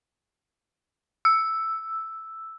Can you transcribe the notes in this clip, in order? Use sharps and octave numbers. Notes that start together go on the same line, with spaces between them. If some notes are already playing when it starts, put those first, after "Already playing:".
E6